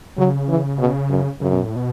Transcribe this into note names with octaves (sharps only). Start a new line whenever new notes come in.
C#3 F#3
E3
B2
F#2
F#2 C#3
B2
A2
B2